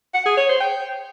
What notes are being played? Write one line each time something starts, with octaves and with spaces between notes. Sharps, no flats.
F#5
G#4
C#5
C5
G5